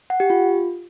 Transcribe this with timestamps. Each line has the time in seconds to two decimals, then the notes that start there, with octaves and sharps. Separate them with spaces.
0.10 F#5
0.20 G4
0.30 F4